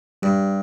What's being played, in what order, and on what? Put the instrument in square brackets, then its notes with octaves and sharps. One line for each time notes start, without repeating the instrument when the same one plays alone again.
[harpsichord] G2 [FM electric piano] G3